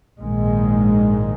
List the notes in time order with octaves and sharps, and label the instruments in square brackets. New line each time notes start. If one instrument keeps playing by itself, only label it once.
[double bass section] A#1 G#2 D#3 G#3